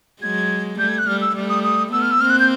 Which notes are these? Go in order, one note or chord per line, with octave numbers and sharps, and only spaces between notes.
F#3 G#3 G#6
G3 A3 G6
G#6
F#6
G3 A3 F6
E6
G3 A3
D#6
D#6
A3 B3 E6
F6
E6
A#3 C4 F6
F#6
G6